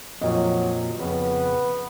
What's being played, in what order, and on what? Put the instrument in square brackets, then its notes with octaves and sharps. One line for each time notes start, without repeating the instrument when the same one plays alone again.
[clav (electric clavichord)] F2 A#2 F3 [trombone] F#3 [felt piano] D#5
[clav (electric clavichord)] F2 C#3 [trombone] B3